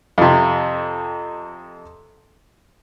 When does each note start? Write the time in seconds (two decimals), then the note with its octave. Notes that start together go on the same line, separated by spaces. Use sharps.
0.18 F2 C3